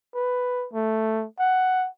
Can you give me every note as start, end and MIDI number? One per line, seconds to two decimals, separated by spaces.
0.15 0.67 71
0.73 1.26 57
1.39 1.88 78